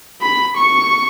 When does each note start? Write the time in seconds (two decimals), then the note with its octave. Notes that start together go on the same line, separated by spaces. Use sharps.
0.21 B5
0.56 C#6